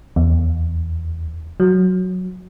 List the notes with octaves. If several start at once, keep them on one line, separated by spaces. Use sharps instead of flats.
E2
F#3